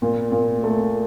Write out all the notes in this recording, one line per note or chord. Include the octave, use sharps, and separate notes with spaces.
A#2
A#2
A3